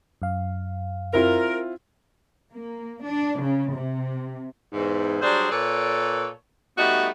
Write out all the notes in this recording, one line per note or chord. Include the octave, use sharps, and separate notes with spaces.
F#2 F5
C4 E4 F4 A#4
A#3
D4
C#3
C3
E2 G#2
F#3 G3 D4 G#4 C5
A#2 A4 B4 C#5 D5
G3 A3 B3 D#4 F#4